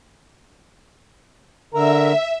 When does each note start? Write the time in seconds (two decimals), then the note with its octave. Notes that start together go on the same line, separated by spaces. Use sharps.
1.74 D3 A#4 E5 A#5